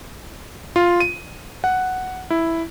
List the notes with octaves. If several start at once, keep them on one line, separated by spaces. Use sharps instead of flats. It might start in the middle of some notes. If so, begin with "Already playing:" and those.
F4
D#7
F#5
E4